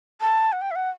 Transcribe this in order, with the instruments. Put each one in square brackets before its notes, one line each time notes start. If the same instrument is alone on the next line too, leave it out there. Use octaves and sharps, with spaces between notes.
[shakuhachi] A5
F#5
G5
E5
F#5